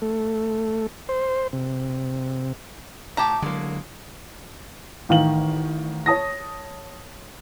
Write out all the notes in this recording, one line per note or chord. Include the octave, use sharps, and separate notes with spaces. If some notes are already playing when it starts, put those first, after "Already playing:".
A3
C5
C3
A2 G4 A5 A#5
D3 F#3 G#3 A#3
A1 D#3 F5 F#7
C#5 A5 D#6 A#6